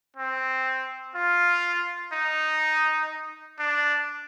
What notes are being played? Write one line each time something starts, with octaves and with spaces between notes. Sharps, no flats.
C4
F4
D#4
D4